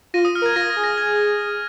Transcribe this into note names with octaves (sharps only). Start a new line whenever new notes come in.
F4 A#6 D#7
D#6
F6
A#4 G#6
F4 A#6
A#6
G#4
A#6
G#6